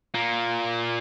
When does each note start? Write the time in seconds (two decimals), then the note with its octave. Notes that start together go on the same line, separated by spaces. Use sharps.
0.14 A#2 A#3